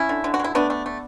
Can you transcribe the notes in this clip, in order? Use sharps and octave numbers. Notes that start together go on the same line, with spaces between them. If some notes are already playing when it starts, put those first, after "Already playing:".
Already playing: C#4 E4
D3
D3
F#4
F#3 E4
A3 B3 D4
A3
A3